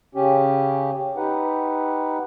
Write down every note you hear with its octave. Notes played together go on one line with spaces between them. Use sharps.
C#3 C#4 G4
D#4 G4 B4 F#5